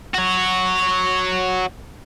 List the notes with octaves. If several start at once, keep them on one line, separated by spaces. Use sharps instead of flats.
F#4 C#5